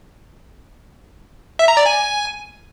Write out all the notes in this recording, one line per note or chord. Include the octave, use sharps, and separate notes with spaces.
E5
A#5
D5
G#5